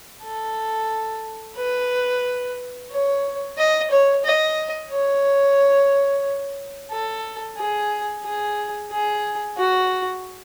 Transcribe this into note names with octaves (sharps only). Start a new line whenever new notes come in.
A4
B4
C#5
D#5
C#5
D#5
C#5
A4
G#4
G#4
G#4
F#4